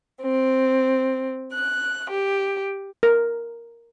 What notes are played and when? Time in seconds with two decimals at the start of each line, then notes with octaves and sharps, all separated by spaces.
0.21 C4
1.52 F#6
2.10 G4
3.03 A#4